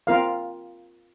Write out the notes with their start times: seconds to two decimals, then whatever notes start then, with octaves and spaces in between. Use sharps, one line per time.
0.07 C4 F4 A#4 F5